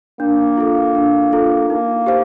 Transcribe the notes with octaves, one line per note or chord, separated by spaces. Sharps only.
A#3 D4
F4 A4
D4
F4 A4
A#3 D#4
G4 C5 F5